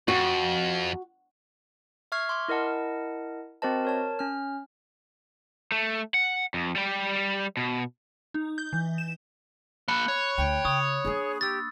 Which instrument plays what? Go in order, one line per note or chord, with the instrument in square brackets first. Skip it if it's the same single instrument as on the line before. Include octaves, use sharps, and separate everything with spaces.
[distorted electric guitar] F2 [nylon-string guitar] F#4
[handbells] E5 C#6 F6 G#6 C7
C6 D6 F6
E4 A#4 D#5 F#5 A5
C4 F#4 A#4 C5 D#5 A5
A#4 C#5 A5
C#4 F6
[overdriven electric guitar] A3
F#5
F2
G3 G5
B2
[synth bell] D#4
G6
E3
E7
[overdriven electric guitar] A#3 A5 [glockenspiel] B5 F#6 C#7
[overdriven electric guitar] C#5
[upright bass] D2 [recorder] G5
[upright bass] C#3 [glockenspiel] C#6 D#6
[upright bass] A#3 D4 [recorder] G#4
[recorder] G4 [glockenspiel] E6 A6